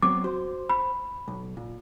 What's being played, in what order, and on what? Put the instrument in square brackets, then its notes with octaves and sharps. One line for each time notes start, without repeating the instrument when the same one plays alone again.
[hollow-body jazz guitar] F#3 B3 C4 [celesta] D6
[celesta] F#4 [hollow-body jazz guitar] C5
[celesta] B5
[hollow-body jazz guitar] B1
A#2